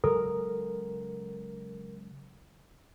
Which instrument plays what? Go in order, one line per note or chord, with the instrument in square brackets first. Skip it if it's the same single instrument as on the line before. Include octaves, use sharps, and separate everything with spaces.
[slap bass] C#3 F#3 G#3 [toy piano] A4 [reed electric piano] A#4